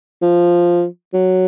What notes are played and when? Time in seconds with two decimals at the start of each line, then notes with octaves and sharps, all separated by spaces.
0.22 F3
1.13 F#3